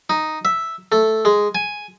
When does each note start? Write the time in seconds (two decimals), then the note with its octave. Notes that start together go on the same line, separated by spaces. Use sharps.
0.10 D#4
0.45 E5
0.92 A3
1.25 G#3
1.55 G#5